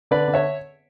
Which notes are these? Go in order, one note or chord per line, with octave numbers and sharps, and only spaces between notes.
D3 B4 D5
D3
C#5 E5